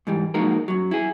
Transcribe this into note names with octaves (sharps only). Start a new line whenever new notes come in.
G#2 E3 G3
F3 F#3 G#3 A#3 D#4 A#4
F#2 F#3
E4 G#4